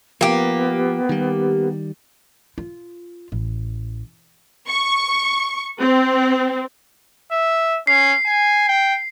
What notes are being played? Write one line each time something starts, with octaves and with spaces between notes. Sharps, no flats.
F3 A#3 B3 G4
D#3 G3
F4
A1
C#6
C4
E5
C#4 C7
G#5
G5